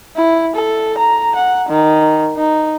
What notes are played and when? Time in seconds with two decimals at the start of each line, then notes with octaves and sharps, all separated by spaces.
0.16 E4
0.56 A4
0.98 A#5
1.35 F#5
1.69 D#3
2.37 D#4